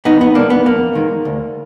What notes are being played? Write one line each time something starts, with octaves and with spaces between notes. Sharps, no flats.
F2 B3 D#4
B3
D#3 G#3 A#3 D4
B3
F2 A#3
D#3 G#3
D2